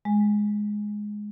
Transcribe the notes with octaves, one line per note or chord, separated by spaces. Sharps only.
G#3